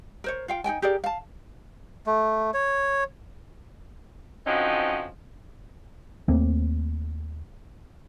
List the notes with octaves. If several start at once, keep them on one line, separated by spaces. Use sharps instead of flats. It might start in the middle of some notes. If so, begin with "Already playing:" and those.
A#4 C5 C#5
F4 F5 G5
D#4 F#4 G5 G#5
G4 G#4 A#4 D5
F5 A5
A3
C#5
D3 F3 F#3 C4 C#4 D#4
D#2 A3 A#3 C4